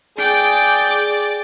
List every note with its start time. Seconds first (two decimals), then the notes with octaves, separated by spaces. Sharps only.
0.18 G#4 D5 G5 D6